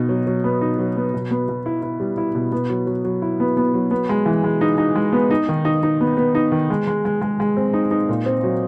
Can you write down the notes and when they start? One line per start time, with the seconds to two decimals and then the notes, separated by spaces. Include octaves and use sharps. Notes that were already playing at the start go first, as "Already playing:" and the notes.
Already playing: B2 D#4
0.09 F#3
0.27 F#3
0.44 B3
0.61 D#4
0.79 F#3
0.96 B3
1.14 B2
1.31 B3
1.48 B2
1.66 E4
1.82 E4
2.00 G3
2.18 E4
2.35 B2
2.52 B3
2.70 F#3
2.87 F#3
3.05 F#3
3.22 E4
3.40 B3
3.57 B3
3.74 F#3
3.91 B3
4.09 G#3
4.26 E3
4.44 G#3
4.61 D#4
4.78 D#4
4.96 G#3
5.13 B3
5.31 D#4
5.49 D#3
5.65 D#4
5.83 D#4
6.01 B3
6.17 B3
6.35 D#4
6.52 D#3
6.70 G#3
6.87 G#3
7.05 G#3
7.21 G#3
7.40 G#3
7.57 C4
7.73 D#4
7.91 D#4
8.09 A#2
8.26 C4
8.44 F#3